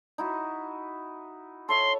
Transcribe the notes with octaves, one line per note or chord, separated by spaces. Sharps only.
D#4 E4 F#4
A4 C#5 E5 C6